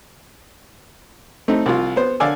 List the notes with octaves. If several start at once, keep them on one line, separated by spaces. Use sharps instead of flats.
A3 C4 D#4
C2 F4
B3 C5
D3 D5 F5 G#5 E6